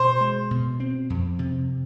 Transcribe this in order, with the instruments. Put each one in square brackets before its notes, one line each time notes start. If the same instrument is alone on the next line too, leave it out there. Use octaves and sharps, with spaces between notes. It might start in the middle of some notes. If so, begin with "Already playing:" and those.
Already playing: [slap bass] B2 [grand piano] C5
[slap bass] G#3
B2
C4
F2
C3